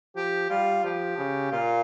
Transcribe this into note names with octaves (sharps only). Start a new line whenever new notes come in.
F3 G4
G3 F4
F3 G4
C#3
A#2 F4